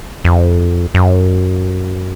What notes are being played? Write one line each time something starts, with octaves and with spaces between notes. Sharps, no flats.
F2
F#2